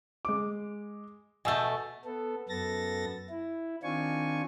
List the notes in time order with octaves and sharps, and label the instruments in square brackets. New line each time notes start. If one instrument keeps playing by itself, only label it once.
[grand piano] G#3 D6
[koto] B2 A3 [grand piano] G#5 E6 G6
[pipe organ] B3 A4
F#2 B3 A4 A6 A#6
E4
D#3 C4 D4 F4 G#5 C#6